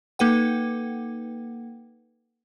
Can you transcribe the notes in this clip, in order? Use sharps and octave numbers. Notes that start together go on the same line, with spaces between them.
A#3 D#4 A4 B4 F#5 G5